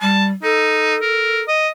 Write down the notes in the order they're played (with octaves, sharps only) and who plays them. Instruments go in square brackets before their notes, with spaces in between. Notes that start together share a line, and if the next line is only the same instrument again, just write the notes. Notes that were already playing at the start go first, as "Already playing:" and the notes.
[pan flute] G3 [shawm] A5
[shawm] D#4 [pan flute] A4
[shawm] A#4
D#5